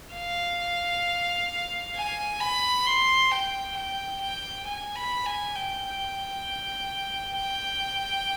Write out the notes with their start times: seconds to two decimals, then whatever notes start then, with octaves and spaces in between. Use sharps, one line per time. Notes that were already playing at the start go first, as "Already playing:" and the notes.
0.15 F5
1.95 G#5
2.40 B5
2.86 C6
3.31 G5
3.76 G5
4.21 G5
4.66 G#5
4.96 B5
5.26 G#5
5.55 G5
7.37 G5